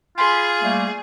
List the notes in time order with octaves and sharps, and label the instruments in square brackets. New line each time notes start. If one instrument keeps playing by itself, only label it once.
[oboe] F4 [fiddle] G#4 [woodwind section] B5 C6
[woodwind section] G3 A3 A#3